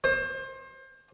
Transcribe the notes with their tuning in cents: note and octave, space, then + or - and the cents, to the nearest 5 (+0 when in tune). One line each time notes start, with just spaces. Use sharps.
C5 +30